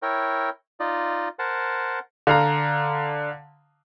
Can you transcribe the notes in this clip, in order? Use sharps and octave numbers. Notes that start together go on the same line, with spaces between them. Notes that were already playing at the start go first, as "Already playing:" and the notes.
E4 A#4 C#5 G5
D#4 F4 D5 D#5
A#4 C5 F#5 A5
D3 F5 A#5